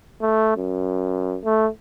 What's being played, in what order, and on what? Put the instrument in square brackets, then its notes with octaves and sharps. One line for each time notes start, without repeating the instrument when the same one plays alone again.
[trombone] A3
F#2
A3